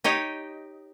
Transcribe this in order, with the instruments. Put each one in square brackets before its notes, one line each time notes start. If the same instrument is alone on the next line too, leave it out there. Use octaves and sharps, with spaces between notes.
[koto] D#4 G4 C#5 D#5